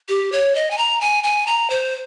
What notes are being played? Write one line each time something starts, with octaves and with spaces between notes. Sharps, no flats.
G4
C#5
D#5
G#5
A#5
G#5
G#5
A#5
C5